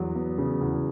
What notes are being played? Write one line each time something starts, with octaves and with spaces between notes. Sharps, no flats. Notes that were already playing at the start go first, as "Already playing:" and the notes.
Already playing: E2 F#3
B3
C#3
E2